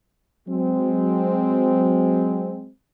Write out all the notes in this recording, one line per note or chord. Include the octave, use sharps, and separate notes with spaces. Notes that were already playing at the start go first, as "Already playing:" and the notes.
F#3 G#3 C4